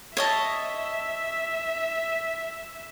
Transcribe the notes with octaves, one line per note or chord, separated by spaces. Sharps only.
C#5 D#5 E5 A5